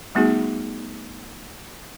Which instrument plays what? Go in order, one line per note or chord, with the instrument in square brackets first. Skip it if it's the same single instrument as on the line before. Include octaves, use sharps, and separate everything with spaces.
[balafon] G3 A3 B3 D#4 F#4 G#4